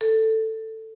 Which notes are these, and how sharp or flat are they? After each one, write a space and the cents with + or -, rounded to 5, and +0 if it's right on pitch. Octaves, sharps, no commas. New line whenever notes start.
A4 +10